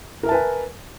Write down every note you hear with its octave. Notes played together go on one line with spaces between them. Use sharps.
A#4 B4 E5 G#5 A5